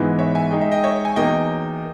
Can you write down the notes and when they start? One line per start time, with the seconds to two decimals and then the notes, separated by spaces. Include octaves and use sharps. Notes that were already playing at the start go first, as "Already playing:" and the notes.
Already playing: G#2 E3 G#3 B3 E4
0.19 C#5 E5
0.35 E5 G#5
0.51 G#3 D#4 G#4 G5
0.61 E5
0.71 D#5 G5
0.84 C#5 E5
1.05 G#5
1.16 E2 B2 A#3 D#4 D#5 G5